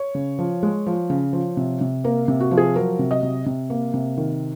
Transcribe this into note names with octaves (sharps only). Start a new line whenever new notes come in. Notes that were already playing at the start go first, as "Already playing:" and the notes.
Already playing: C#5
C#3
F3
G#3
F3
C#3
F3
C3
C3
A#3 A#4
C3
F#4
F3
G#4
F#3 A#4
C3
D#5
C3
C3
A#3
C3
D#3